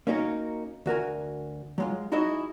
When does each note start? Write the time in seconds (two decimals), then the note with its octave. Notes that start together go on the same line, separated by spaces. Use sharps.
0.07 A#3 C#4 D#4 F#4 A#4
0.86 D2 F#4 A#4 G#5
1.78 F#3 G#3 F4
2.12 D#4 E4 F#4 G#4 D#5 E5